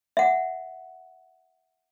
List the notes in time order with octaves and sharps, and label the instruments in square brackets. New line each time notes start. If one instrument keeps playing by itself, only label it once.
[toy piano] E5 F#5